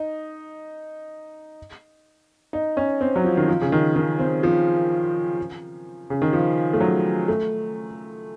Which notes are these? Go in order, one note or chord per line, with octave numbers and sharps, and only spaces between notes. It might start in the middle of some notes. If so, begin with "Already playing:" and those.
Already playing: D#4
D#4
C#4
C4
F#3
F3
D#3
F3
C#3
D#3
D#3
C4
F3
C#3
D#3
F3
A3
F#3
A3